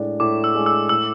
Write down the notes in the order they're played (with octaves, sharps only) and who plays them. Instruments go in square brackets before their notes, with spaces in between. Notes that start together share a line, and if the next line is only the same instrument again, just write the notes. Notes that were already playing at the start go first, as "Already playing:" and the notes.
Already playing: [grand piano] A2 G#3 D4
[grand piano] A2 [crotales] D6
[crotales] E6
[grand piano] G#3 D4
[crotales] E6
[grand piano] A2 [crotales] E6